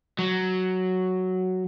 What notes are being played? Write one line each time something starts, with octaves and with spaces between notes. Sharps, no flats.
F#3